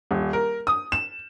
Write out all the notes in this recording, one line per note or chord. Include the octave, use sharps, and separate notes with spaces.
D#1
A#4
D#6
E7